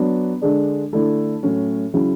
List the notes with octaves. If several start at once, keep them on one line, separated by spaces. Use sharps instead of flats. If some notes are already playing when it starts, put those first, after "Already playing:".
Already playing: F#3 B3 D4
D3 G#3 D4
D3 A3 E4
A2 F#3 A3 C#4
C#3 F#3 C#4 E4